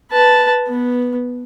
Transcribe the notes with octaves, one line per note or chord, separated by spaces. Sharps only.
B4 A5
B3